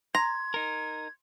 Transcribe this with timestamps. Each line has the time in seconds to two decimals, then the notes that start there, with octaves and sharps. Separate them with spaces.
0.15 A#5 C6 G#6
0.54 D#4 A#4